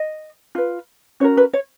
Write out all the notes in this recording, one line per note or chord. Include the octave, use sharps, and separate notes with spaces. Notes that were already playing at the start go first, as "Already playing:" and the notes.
Already playing: D#5
F4 B4
C#4 F#4 A#4 C#5
B4
C#5